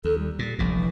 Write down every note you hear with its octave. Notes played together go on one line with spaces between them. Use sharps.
D#2 A4
G3
A#2
F1 A#1 A#2
E3